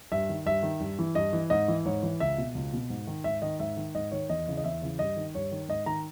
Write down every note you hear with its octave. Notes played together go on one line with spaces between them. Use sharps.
G2 E5
D#3
G2 E5
D#3
G2
E3
G2 D#5
E3
G#2 D#5
E3
G#2 C#5
E3
C#2 E5
B2
C#2
B2
G#2
D#3
G#2 E5
D#3 D#5
G#2 E5
D#3
G#2 D#5
D#3 C#5
E2 D#5
C#3 E3
D#5
E2 E5
C#3 E3
G2 D#5
D#3
G2 C#5
D#3
G#2 D#5
D#3 A#5